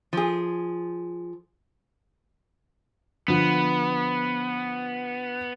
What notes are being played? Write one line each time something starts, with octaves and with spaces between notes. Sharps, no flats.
F3 G#4
D3 F3 B3